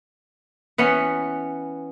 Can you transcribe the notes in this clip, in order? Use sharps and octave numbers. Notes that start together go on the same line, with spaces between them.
E3 B3 C#4